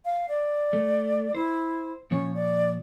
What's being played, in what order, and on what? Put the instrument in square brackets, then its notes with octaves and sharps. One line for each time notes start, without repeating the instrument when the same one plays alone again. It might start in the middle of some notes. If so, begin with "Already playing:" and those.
[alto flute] F5
D5
[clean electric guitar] A3
[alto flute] E4 [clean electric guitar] C5
[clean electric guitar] A#2 F3 C#5 [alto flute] C#4
[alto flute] D5